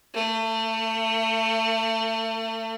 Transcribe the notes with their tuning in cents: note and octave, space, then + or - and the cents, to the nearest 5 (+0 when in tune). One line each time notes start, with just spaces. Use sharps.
A3 +30